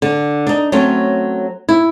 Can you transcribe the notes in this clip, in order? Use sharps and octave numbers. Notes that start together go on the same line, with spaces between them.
D3
D4 D#4
F#3 A3 C4 C#4
E4